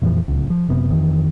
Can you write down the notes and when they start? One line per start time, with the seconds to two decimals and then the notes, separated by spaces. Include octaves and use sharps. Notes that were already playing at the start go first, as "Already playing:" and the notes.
0.02 F2 A#2 E3 F3
0.28 D1 C#2
0.50 F3
0.69 F#1 C3 B3
0.90 F2 D#3 E3